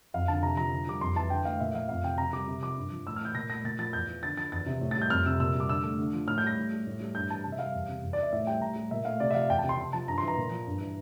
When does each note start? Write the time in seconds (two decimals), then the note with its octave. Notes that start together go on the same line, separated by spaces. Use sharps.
0.14 F2 F5
0.28 D3 A5
0.42 C3 A#5
0.57 F3 A#5
0.73 D3
0.87 G3 D6
1.01 F2 C6
1.16 E3 A5
1.30 D3 G5
1.45 A3 F5
1.60 A#2 E5
1.74 F3 F5
1.89 F2 F5
2.04 C3 G5
2.18 C3 A#5
2.33 G3 D6
2.47 C3
2.63 F3 D6
2.77 G2
2.92 F3
3.07 A2 E6
3.16 F6
3.21 E3 G6
3.35 A#2 A#6
3.50 A3 A#6
3.64 A#2 A6
3.79 F3 A6
3.93 E2 G6
4.08 E3
4.23 D3 A6
4.37 F3 A6
4.52 E2 A6
4.66 C3
4.81 A2
4.91 A6
4.96 G3
5.02 G6
5.10 F2 F6
5.26 C3 E6
5.40 A#2 E6
5.55 G3 D6
5.69 D3 E6
5.83 A3
5.99 D3
6.13 F3
6.28 A2 F6
6.38 G6
6.43 G3 A#6
6.57 A2
6.72 G3
6.87 A2
7.00 G3
7.15 G2 G6
7.29 E3 A5
7.44 C3 A5
7.52 E5
7.59 G3 F5
7.75 E2
7.88 C3
8.03 E2
8.13 D5
8.17 E3 E5
8.33 A2 E5
8.47 G3 G5
8.61 A2 A#5
8.76 G3
8.91 A#2 E5
9.05 A3 F5
9.20 C3 D5
9.31 E5
9.35 F3 F5
9.49 E2 G5
9.59 A5
9.64 C3
9.69 C6
9.78 C3
9.93 F3 A5
10.08 G2 A#5
10.18 C6
10.23 E3 A#5
10.37 A#2
10.51 F3
10.67 G2
10.81 E3